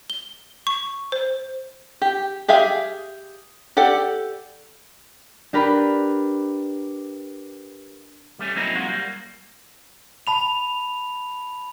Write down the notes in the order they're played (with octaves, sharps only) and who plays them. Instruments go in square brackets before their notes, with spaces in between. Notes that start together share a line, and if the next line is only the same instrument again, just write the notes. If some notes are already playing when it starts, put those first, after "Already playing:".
[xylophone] G7
C#6
C5
[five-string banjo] G4
G4 G#4 E5 F5
G4 A4 D5 F#5
[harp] D4 G4 A#4 B4 B5
[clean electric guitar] G3 A3 C#4
F#3 A#3 C4 C#4 D#4 E4
G#3 A#3 F4 F#4
G3 A#3
[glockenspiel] A5 B5 F7